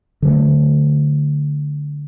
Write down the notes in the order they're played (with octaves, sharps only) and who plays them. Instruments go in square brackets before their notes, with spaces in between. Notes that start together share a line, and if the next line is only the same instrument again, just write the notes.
[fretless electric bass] D3 F#3 A3